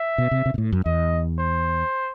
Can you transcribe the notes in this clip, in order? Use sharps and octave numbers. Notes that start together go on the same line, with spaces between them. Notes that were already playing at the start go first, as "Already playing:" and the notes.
Already playing: E5
B2
C3
C3
B2
A2
F#2
E2 D#5
C5